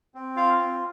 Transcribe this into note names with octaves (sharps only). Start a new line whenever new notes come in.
C4
F4 F5
C4